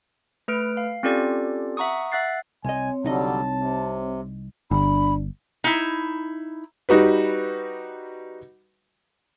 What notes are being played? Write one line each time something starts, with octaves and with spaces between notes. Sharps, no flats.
A3 B4 F6 D7
F5
C4 C#4 F4 G4 A4 D5
E5 F#5 A#5 C#6 D#6
E5 F#5 F#6 A6 C7
C2 C4 C#5 D#5 G#5
C2 D3 F#3 G3 D#4 D#5 A5
C3
G1 D4 B5
D#4 E4
G3 D#4 F#4 B4